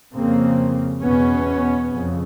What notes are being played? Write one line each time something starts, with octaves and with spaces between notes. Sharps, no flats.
F2 C#3 A#3 C4
E2 B2 B3 C#4
F2 C#3